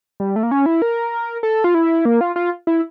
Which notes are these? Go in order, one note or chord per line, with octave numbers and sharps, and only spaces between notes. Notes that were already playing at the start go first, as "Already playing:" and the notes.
G3
A3
A#3
C#4
E4
A#4
A4
F4
E4
A#3
F4
F4
E4